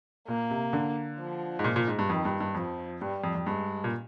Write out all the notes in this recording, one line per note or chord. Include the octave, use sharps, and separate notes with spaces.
A#2 A#3
C3
D3
F3
G#2
A#2
A#2
G#2
G2
F2 D#3
G2
G2
F2 F3
G2 G3
F2
F2
G2 G#3
A#2